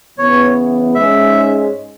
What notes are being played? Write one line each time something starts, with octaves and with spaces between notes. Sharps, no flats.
E2 C#3 E3 B3 C#5
G#2 G#3 C#4 E5